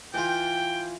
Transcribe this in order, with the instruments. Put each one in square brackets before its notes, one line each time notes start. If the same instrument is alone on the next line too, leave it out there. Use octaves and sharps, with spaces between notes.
[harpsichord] E3 F4 [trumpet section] G5